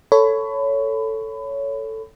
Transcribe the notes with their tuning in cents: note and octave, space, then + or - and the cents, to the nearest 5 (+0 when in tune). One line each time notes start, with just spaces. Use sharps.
A4 +10 C#5 +10 B5 +25